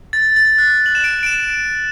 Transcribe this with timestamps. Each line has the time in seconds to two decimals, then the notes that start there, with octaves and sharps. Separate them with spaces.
0.13 A6
0.36 A6
0.58 F#6
0.86 F#7
0.95 E7
1.04 D7
1.23 D7
1.26 E7